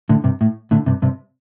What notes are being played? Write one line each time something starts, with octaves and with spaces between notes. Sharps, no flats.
A2 D3
G2 C3
A2
A2 D3
G2 C3
G2 C3